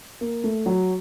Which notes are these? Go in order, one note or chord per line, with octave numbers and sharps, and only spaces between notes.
A#3
A3
F#3